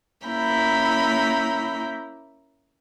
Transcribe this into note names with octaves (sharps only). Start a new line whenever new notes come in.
A#3 C#4 E4 A#5 B5 G6